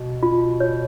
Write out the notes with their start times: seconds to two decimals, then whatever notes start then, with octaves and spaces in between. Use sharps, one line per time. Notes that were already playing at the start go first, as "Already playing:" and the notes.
Already playing: B2
0.23 F4
0.60 C#5